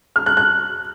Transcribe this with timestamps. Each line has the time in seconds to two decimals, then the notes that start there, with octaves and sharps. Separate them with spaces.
0.16 F6
0.26 F#6
0.37 F#6